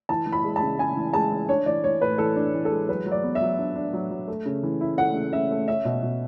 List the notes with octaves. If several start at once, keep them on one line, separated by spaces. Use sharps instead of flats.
E3 A5
E3
B5
G#3
A5
C#3
C#3 G#5
E3
G#3 A5
E3
D4 C#5
E3 D5
E3 C#5
A2 B4
E3 A4
D4
E3
A4
G#3
F#3 B4
F#3
D5
B3
E5
F#3
D4
D4
F#3
F#3
A3
C#3
E3
E4
A3 F#5
C#3
C#3 E5
A3
C#4 E5
B2
B2